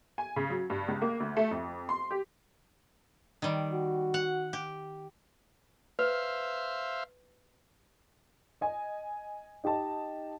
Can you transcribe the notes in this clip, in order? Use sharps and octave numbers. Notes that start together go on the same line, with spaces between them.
G#5
C#3
F#3
G2
C#2
A#3
D2
A3
F2
C6
G4
D#3 G3
F#4
F#5
G4
B4 C5 E5 F5
D#5 G#5
D#4 G4 D#5 A5